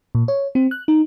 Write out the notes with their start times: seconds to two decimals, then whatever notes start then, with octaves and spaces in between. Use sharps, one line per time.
0.15 A#2
0.28 C#5
0.55 C4
0.71 F#6
0.88 D#4